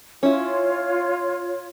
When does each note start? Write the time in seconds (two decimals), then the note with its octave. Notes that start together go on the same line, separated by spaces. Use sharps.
0.23 C#4 E4 F4 C#5